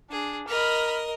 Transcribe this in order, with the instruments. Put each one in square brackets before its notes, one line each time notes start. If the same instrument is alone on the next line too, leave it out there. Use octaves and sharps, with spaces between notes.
[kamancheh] D4 [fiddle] G#4
[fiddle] A#4 D#5 [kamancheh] B5 F6